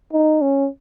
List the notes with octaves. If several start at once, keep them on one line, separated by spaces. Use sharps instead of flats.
D#4
C#4